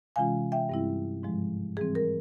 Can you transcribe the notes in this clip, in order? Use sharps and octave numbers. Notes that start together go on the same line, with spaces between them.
C3 E3 G#3 C#4 F4 F5 G#5
E5 G5
G2 G3 C4 E4
G#2 F3 G#3
E3 G3 C4 G#4
A#4